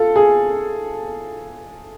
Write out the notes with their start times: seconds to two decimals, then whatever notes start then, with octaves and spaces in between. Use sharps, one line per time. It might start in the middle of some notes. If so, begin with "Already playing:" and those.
Already playing: F4 A4
0.16 G#4